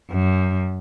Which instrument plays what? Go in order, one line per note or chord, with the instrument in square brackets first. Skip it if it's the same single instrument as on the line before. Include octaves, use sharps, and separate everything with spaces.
[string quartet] F#2